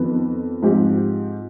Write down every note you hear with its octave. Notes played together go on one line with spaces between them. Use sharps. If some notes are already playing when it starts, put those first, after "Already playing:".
Already playing: F2 D#3 B3
G#2 F3 C4 G4